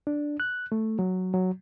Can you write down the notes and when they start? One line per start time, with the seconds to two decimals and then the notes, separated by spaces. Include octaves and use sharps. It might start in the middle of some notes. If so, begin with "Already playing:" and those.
0.07 D4
0.40 F#6
0.72 A3
0.99 F#3
1.34 F#3